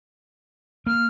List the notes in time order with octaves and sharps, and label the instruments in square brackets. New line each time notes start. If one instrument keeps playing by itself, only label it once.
[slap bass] A#3 [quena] F6